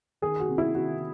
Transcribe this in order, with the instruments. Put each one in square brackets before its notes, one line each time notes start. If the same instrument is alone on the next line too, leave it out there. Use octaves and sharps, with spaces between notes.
[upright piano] D#3 G#4
F#4
C3
E4
D#3 F#4